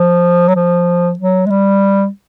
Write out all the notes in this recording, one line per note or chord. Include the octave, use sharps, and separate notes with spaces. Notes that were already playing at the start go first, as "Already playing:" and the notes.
Already playing: F3
F#3
F3
F#3
G#3
G3